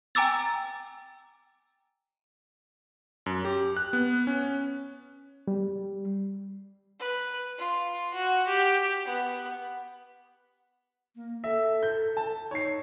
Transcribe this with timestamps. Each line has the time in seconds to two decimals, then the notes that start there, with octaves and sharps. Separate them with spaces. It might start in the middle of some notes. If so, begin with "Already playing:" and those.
0.15 G5 G#5 A#5 D6 E6 A6
3.26 F#2
3.45 G4
3.77 F#6
3.93 B3
4.27 C#4
5.48 G3
6.99 B4
7.58 F4
8.14 F#4
8.47 G4
9.06 B3
11.16 A#3
11.44 A4 E5
11.83 G6
12.17 A5
12.51 D#4 C#5 C7